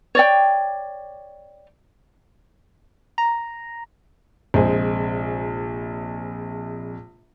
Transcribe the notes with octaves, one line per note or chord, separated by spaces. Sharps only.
C#5 D5 G5
A#5
A#1 C3 G#3 C5 G#5